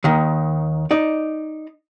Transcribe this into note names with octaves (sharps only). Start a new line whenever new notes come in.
D#2 D#3
D#4 D5